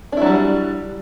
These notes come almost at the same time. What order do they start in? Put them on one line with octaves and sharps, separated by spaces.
D4 E4 F#3 G3